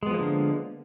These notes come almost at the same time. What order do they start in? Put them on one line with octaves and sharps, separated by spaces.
G#3 B3 F3 A#3 D3